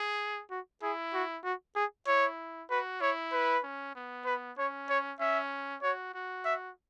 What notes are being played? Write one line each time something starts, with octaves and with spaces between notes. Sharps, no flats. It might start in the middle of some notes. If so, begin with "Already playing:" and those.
Already playing: G#4
F#4
E4 G#4
F#4
F#4
G#4
E4 C#5
F#4 B4
E4 C#5
B4
C#4
B3
B4
C#4 C#5
C#5
C#4 E5
F#4 C#5
F#4
E5